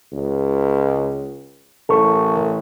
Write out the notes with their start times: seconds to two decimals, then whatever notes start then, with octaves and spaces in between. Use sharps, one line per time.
0.12 C#2
1.89 A1 A4 A#4 C#6